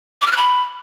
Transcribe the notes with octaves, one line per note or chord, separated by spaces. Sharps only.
D6
F6
F#6
B5